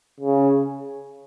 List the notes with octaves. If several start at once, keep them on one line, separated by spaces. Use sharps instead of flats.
C#3